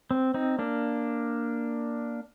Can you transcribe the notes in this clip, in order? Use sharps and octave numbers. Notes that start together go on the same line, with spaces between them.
C4
C4 D#4
A#3 D4